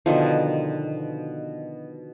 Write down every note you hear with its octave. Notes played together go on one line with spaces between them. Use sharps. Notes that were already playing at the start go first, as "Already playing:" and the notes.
B2 D3 D#3 F3